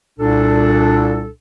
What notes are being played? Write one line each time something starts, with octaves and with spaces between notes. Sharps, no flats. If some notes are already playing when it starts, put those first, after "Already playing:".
C2 A#2 D4 A4